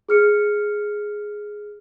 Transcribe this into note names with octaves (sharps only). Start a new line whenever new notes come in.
G#4 F6 C#7